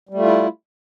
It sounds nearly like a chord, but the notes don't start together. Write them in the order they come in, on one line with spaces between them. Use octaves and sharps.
G3 A3 F4 E4